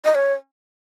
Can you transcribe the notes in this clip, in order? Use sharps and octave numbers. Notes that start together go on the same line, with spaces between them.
D#5
C#5